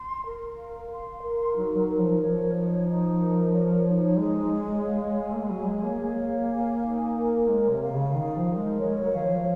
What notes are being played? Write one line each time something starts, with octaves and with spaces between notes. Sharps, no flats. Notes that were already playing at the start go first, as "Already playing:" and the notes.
Already playing: C6
A#4
F5
C6
A#4
F#3 D#4
F#3
A#4
F3
F3 C#5
D#4
D#4
A#4
C#5
D#4
G#3 G#4
C#5
F5
G#5
A#3
G#3
F#3 G#4
G#3
A#3 C#5
A#3
F5
G#5
D#4
A#4
G#3 C#5
C3
F5
C#3
D#3 D#4
F3
A#4
G#3
G#3 C#5
F#3
D#3 F5
F3